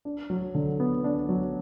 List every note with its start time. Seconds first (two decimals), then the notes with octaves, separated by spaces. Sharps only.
0.05 D4
0.30 F#3
0.55 D3
0.80 B3
1.04 D4
1.29 F#3